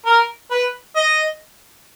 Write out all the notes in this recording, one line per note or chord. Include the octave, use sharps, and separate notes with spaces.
A#4
B4
D#5